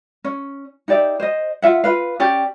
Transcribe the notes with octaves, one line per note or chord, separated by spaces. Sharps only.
C#4
D#4 G4 D5 E5
C5 D#5
F4 E5 F#5
F4 B4 F5
C#4 G4 D5 G5